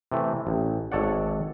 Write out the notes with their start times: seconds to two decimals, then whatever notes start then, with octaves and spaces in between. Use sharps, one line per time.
0.12 C3 E3 A3
0.47 A1
0.92 G#1 A4 C#5 D5 F#5